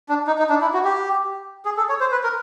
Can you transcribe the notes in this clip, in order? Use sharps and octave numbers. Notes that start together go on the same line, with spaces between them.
D4
D#4
D#4
D4
E4
F#4
G4
G#4
A4
C#5
C5
B4
A#4